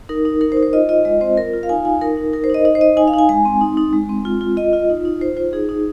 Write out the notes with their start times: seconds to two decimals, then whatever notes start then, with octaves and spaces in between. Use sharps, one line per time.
0.09 D#4 A#4
0.25 D#4
0.41 D#4 A#4
0.52 C5
0.57 D#4
0.63 C5
0.73 F4 D#5
0.89 F4 D#5
1.05 G#3 D#5
1.21 C4 C5
1.37 F4 A#4
1.53 F4
1.63 F5
1.69 D#4 G#5
1.85 D#4 G#5
2.01 D#4 A#4
2.17 D#4
2.33 D#4 A#4
2.44 C5
2.50 D#4 D#5
2.65 D#4 D#5
2.75 C5
2.81 D#4 D#5
2.97 D#4 G#5
3.08 F5
3.14 D#4 G#5
3.29 G#3 G#5
3.45 C4
3.61 D#4
3.77 D#4
3.93 G#3
4.09 C4
4.25 F4
4.41 F4
4.57 F4 D#5
4.73 F4
4.90 D#4
5.05 D#4
5.21 F4 C5
5.37 F4 C5
5.53 D#4 G#4
5.69 D#4